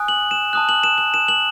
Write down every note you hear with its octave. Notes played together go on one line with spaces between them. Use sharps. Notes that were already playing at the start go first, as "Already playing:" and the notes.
Already playing: G#5 D#6 F#6
F#7
E7
A5 D#6 F#6
F#7
E7
F#7
E7
F#7